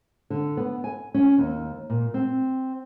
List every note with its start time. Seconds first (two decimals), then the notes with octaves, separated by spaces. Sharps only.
0.30 D3
0.57 B3
0.84 G#5
1.14 C#4
1.38 D#2
1.90 A#2
2.14 C4